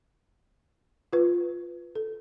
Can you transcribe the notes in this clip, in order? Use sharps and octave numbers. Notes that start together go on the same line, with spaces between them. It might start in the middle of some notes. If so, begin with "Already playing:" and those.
F4 B4
A4